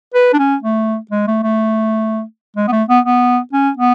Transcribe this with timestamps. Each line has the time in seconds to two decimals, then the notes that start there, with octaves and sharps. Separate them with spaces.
0.14 B4
0.33 D4
0.39 C#4
0.62 A3
1.11 G#3
1.27 A3
1.43 A3
2.57 G#3
2.68 B3
2.72 A3
2.89 B3
3.05 B3
3.53 C#4
3.77 B3